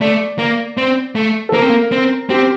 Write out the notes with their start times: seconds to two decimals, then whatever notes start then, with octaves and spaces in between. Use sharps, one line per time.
0.01 A3 D5
0.38 A#3
0.77 C4
1.15 A3
1.49 A4
1.53 A#3 A#4
1.62 C4
1.69 A#3
1.92 C4
2.29 C4 G4